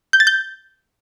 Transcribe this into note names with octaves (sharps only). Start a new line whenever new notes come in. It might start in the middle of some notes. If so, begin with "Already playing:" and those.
G6
A6
G6